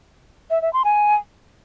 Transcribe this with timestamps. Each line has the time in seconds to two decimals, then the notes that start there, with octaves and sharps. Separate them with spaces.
0.50 E5
0.62 E5
0.73 C6
0.85 G#5